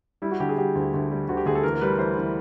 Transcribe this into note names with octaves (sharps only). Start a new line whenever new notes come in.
G3 E4
F#4
D3 G4
G#4
G3 G4
D2
D2
G3
D2 F#4
G4
D2 G#4
A4
E3 A#4
A#4
G3 B4
E3 C5
E3